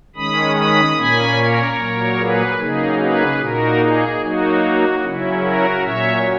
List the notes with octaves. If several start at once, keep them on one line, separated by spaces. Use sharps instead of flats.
D#3 G#3 C#4 B5 D#6
B5 D#6
A#2 A#3 C#4 G#5 B5
A#4 C#5
A#2 F#3 A#3
G#4 B4
C#3 F#3 A#3 D#4 G#4
G#4 B4
A#2 A#3 D#4 F#4 A#4
G#4
F#3 A#3 D#4 F#4
C#3 F#3 C#4 E4
F#4 A#4
A#2 F#3 C#4 C#5 E5